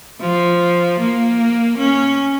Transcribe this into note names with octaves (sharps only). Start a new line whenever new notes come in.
F3
A#3
C#4